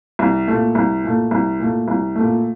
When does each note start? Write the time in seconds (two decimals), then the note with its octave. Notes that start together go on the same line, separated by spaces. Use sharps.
0.19 C2
0.48 A#2 A3
0.75 C2
1.04 A#2 A3
1.31 C2
1.60 A#2 A3
1.88 C2
2.16 A#2 A3